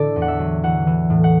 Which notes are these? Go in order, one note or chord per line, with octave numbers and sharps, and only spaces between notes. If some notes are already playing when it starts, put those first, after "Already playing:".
Already playing: A2 D3 D4 E4 A4 D5
E2
F#5
E5
F#3
E3 F#5
E3
A2
F#5